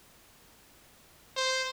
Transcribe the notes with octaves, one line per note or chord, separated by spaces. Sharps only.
C5